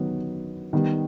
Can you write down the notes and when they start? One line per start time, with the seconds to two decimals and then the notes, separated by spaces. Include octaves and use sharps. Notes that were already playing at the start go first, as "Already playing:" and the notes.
Already playing: D#3 F#3 B3
0.73 D#3 G3 B3